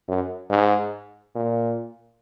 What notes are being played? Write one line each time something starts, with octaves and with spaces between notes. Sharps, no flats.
F#2
G#2
A#2